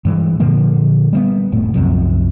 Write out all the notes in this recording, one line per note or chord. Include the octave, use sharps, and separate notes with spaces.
G2 E3 G#3
A#2 D3 F3 A#3
G3 G#3 B3
F1 A2 A3
C2 F#2 C3 F3